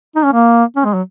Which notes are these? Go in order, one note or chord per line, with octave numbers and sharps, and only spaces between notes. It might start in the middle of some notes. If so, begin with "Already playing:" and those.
D#4
C#4
A#3
C#4
G#3
F#3